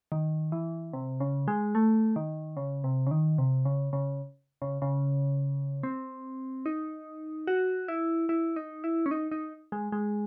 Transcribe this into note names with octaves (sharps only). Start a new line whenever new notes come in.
D#3
E3
C3
C#3
G#3
A3
D#3
C#3
C3
C#3
D#3
C3
C#3
C#3
C#3
C#3
C4
D#4
F#4
E4
E4
D#4
E4
C#4
D#4
D#4
G#3
G#3